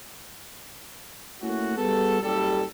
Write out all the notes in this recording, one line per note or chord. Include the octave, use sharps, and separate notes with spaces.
A3 A#3 C#4 E4 F#4
G3 B3 F#4 G#4 A4
F#1 G3 A4